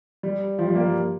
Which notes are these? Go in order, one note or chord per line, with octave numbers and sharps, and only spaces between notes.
G3
F3
G3
A#3
G3